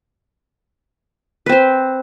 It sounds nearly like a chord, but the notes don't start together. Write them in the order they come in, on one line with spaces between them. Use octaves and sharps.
B4 C4 C5